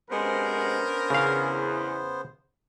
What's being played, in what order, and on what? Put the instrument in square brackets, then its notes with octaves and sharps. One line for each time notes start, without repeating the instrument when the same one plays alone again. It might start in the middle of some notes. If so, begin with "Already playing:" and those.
[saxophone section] F#2 C3 G#3 [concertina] B3 C5 [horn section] C#4 D4 A#4
[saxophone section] E2 [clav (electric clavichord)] C#3 F5